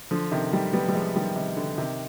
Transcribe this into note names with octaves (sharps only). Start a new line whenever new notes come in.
D3 F3
C3 D#3
D#3 G3
G3 B3
G3
F3 G#3
D#3 G3
C3 D#3
D3
C3 D#3